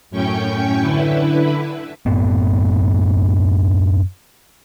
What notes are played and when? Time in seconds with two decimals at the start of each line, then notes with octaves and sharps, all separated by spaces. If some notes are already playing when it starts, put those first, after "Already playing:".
0.11 F#2 A2 C#4 G5 C#6 G6
0.81 D3 E4 B4
2.06 F#2 A2 B3